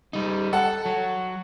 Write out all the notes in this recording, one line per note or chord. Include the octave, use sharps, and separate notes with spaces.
G3 D#4
A4 F#5
F#3